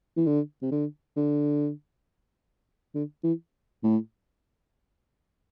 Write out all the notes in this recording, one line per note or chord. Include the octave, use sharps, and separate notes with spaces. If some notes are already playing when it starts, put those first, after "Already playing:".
E3
D3
C3
D3
D3
D3
E3
A2